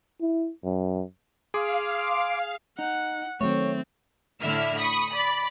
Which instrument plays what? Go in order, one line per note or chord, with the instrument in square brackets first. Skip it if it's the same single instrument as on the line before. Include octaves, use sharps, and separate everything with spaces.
[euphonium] E4
F#2
[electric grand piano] G#4 [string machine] F5 [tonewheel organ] C6 D6
[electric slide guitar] D#4 [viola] F#5
[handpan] D#3 F#3 A3 [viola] C4 [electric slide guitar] C#5
[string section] A2 D3 E4 E5 F6
B5 C#6 D#6
D5 B5